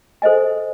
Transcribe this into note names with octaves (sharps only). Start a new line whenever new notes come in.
A4 C5 D#5 G#5